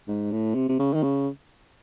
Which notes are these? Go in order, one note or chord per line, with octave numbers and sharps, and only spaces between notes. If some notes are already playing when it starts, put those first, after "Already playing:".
G#2
A2
C3
C3
C#3
D#3
C#3